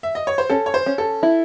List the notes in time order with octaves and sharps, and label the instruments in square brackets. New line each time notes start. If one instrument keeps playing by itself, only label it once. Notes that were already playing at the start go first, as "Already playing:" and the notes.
[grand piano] E5
D#5
C#5
C5
[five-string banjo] C#4 [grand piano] A4
[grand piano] C#5
C5
[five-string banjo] C#4
[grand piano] A4
[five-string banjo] E4